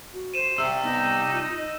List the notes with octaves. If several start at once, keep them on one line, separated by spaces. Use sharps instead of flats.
F#4
C5 D#7 E7
C3 G3 E5 E6
B3 D#4
F4
D#5